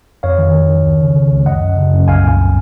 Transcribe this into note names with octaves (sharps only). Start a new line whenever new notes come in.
F2 C#5 F5
D#3
D#3
D#3
C#2
C#3
C#3
C#2
F#2 D#5 F#5
F#2
C#3
F#2
C2 F5 G#5
A#2